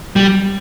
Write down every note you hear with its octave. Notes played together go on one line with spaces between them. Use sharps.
G3